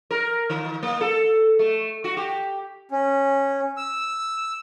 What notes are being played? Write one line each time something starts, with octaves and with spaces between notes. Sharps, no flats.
A#4
D#3
A#3
A4
A3
F#4
G4
C#4
E6